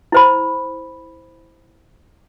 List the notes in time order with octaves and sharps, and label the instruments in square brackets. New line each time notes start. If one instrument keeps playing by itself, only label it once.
[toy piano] E4 C5 B5